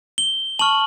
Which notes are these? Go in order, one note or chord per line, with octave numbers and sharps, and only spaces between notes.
G7
A5 C#6 F6 F#7